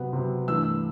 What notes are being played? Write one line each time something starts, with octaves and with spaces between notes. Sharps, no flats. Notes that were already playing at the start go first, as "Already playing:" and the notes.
Already playing: C3 F#3 B3
C3 F#3 B3
G2 E3 A3 E6